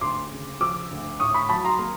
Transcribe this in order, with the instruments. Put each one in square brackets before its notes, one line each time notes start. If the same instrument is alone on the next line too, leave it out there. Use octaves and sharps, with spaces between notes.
[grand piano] D2 C6 D6
C#3
F3 D6 E6
D2
A2 C#6 D#6
B5 C#6
F#3 A5 B5
A#5 C6
A#3